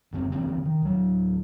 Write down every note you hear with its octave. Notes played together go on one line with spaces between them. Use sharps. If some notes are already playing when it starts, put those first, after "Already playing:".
F#1 D3 C4
D3 E3 F3 C4
D#3
D1 F#3